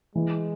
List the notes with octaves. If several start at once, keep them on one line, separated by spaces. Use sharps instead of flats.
E3 G#3